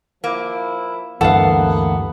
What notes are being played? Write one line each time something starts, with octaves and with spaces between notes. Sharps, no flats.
F3 A#3 E4
D2 G2 E3 A#3 B3 A4 F5 F#5